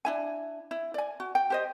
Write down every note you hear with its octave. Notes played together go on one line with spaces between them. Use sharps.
D4 E4 G#5
E4
D5 G#5
F#4
G5
G4 C5 D#5